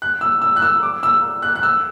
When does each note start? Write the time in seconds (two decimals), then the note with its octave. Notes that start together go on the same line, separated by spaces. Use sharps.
0.02 F#6
0.21 E6
0.42 E6
0.56 F#6
0.62 E6
0.83 D6
1.03 E6
1.42 F#6
1.56 F#6
1.63 E6